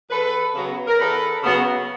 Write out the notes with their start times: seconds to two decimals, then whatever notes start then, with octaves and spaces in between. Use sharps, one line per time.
0.10 E2 A4 B4
0.54 C#3 F#3 B3
0.87 A#4
0.99 E2 A4 B4
1.43 C#3 F#3 B3